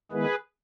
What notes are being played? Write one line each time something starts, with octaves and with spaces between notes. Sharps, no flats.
D#3 G#3 B3 E4 G#4 B4